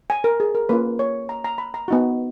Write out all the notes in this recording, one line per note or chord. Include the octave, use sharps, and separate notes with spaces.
G#5
A#4
G#4
A#4
A#3 C#4 F4 B4
C#5
A#5
A#5
B5
A#5
B3 D#4 F#4